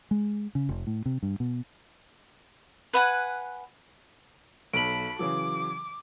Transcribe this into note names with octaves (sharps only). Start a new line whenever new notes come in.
G#3
C#3
F1
A2
C3
G2
B2
B4 F#5 G#5
B1 A4 B5 D7 F#7
C#3 E3 F#3 D6